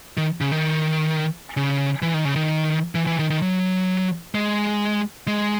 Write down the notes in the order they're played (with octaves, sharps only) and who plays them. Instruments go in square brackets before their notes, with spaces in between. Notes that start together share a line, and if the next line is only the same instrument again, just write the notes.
[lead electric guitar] D#3
C#3
D#3
C#3
E3
D#3
C#3
D#3
E3
E3
D#3
D#3
F#3
G#3
G#3